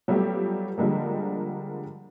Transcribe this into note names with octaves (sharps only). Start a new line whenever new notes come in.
F#3 G3 A3 B3 F4 G4
D3 F3 G3 G#3 A#3